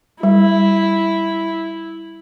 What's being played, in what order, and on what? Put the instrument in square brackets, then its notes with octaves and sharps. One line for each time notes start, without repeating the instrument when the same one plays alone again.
[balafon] G3 [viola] E4